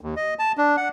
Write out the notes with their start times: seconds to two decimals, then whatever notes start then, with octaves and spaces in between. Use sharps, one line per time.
0.01 D#2
0.16 D#5
0.39 A5
0.57 D4
0.77 F#5